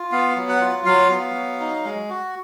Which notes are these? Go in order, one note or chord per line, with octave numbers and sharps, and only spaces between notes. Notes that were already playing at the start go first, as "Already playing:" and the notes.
Already playing: F4
B3 F5
F#3
F#5
F4
F#3 F5
B3
F#3
D#4
G#3
F#4